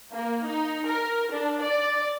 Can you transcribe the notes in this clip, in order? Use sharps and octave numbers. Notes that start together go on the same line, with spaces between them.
A#3
D#4
A#4
D4
D5